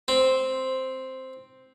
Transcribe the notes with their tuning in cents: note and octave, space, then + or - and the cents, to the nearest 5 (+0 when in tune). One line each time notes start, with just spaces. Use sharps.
C4 +0